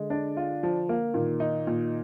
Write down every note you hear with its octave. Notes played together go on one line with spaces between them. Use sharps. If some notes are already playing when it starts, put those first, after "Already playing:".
Already playing: D3 G#3
D4
F4
F3
A#3
A#2 D#3
D#4
A#2